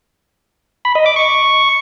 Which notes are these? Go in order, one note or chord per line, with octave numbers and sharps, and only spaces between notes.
B5
D#5
D6
C#6